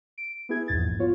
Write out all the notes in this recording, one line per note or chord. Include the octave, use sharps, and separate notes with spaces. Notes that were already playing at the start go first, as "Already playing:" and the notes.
D7
B3 E4 G#4 G#6
A#1 E2 G#2 G#6 A6
B3 F4 C#5